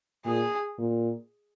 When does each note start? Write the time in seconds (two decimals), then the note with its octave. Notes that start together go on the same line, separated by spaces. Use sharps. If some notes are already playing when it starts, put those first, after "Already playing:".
0.25 A#2 G#4
0.78 A#2